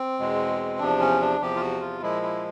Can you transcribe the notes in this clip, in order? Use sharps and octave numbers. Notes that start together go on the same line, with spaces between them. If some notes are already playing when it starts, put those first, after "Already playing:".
Already playing: C4
E2 B2 G#3
E2 C3 F3 D4
C#4
D4
E2 C3 F3 G4
F4
F#4
F4
A#2 F3 G#3 E4
E4